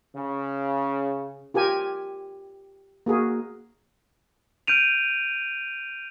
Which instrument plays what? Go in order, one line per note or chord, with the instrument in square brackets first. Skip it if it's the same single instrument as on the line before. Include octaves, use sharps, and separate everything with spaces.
[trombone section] C#3
[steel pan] F4 G4 A#4 G#5
A#3 F#4 G#4 A#4
[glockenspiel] F6 G6 D7 D#7 F7